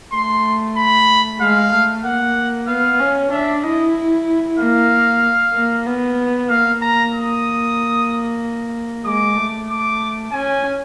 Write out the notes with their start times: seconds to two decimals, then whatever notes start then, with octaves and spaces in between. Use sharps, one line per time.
0.13 A3 C6
0.77 B5
1.40 G#3 F5
1.72 A3
2.04 A#3 F#5
2.67 B3 F5
3.00 C#4
3.31 D4 E5
3.63 E4 D#5
4.58 A#3 F5
5.54 A#3
5.86 B3
6.49 A#3 F5
6.82 A#5
7.13 D#6
9.05 G#3 D6
9.36 A3
9.69 D6
10.32 C#4 G#5